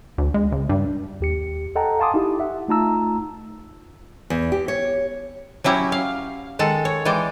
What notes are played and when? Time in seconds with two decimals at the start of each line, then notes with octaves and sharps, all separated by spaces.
0.18 D2
0.34 G#3
0.52 C#2
0.69 G2
1.20 D#2 G4 C#7
1.76 A4 D#5 F#5 G5 A5 A#5
2.00 F5 G#5 A5 C6 D6 D#6
2.14 D#4 E4 G4
2.40 E5 F#5
2.68 A3 D#4 F4 A5 A#5 E6
4.30 E2
4.52 G4
4.68 C#5
5.64 F#3 C#4 E4 G4
5.92 F5
6.59 D#3 G#3 A4 F#5
6.85 C#5
7.05 E3 G#3 D5 G5